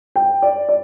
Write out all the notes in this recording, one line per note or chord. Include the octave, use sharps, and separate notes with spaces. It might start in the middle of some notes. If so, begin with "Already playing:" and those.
G5
D5
D5